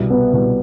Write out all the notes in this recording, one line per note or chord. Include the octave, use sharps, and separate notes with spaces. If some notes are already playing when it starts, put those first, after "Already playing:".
Already playing: C2 B2 G3
B3
C2 B2 G3